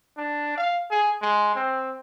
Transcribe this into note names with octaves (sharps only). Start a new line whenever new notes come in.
D4
F5
G#4
G#3
C4